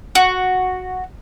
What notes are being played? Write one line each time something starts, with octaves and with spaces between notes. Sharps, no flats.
F#4